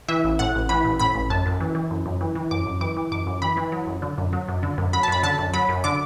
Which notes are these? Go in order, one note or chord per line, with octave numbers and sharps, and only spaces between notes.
E3 E5
A1
A2 F#5
A1
E3 B5
A1
A2 B5
A1
F#2 A5
F#2
E3
E3
F#2
F#2
E3
E3
F#2 D6
F#2
E3 D6
E3
F#2 D6
F#2
E3 B5
E3
F#3
F#2
D3
F#2
F#3
F#2
D3
F#2
F#3 B5
A5
F#2 B5
D3 A5
F#2
F#3 B5
F#2
D3 D6